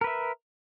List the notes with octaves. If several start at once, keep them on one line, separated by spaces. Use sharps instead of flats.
A#4 B4 E5